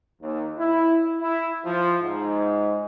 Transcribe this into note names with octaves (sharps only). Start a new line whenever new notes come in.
D#2
E4
E4
F3
G#2